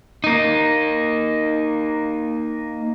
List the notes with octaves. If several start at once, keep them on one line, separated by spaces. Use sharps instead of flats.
A#3 D#4